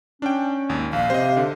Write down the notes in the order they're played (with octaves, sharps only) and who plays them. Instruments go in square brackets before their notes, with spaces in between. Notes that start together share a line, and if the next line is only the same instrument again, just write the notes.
[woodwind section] C#4 [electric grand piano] D4 G5
[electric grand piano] G#1 D#2
[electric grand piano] A#1 [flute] F5
[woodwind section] C3 C4 [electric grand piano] C5 D#5
[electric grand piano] D3